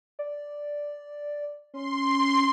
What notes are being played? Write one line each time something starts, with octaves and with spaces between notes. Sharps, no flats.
D5
C#4 C6